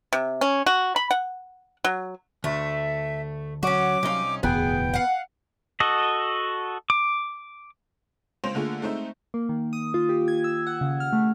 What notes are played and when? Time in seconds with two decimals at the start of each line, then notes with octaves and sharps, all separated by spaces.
0.13 C3
0.41 C#4
0.66 F#4
0.96 B5
1.11 F#5
1.84 F#3
2.44 D2 A3 E5
3.63 F#3 C#4 F#4 D6
4.03 C2 C#4 D#4 D#5 F5
4.43 D1 E2 B2 B3 G#4 B4 G5 B5
4.94 F5 F#5
5.80 F#4 A4 D#5
6.90 D6
8.44 C#2 C5 C6 A#6 F7
8.55 D3 A3 A#3 F4 G#4
8.81 G#3 A3 C4 D#4 C5 E5
9.34 A#3
9.49 D#3
9.73 D#6
9.94 F4
10.09 G4
10.28 G#6
10.44 E6
10.67 F#5
10.81 C#3
11.00 F6
11.13 A3